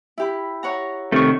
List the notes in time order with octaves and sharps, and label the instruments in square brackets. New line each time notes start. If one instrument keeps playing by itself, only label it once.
[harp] E4 G4 B5
C#5 F#5 A#5
[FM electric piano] C3 C#6 [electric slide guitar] D#3 A3